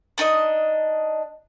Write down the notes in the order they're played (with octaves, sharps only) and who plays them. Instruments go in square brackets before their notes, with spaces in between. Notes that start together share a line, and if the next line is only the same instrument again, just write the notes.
[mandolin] D4 D#4 C#5 D#5